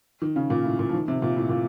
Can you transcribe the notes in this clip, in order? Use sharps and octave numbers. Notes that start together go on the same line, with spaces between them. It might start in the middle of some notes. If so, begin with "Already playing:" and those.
D#3
C#3
A#2
A2
A#2
F3
D#3
C3
A#2
A2
A#2